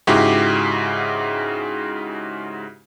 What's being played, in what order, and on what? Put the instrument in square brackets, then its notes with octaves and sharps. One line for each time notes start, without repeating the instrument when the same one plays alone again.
[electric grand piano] G#2 C#3 E4 F#4 G4